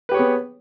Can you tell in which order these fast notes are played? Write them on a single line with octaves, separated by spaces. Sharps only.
B4 G4 C#5 G#4 B3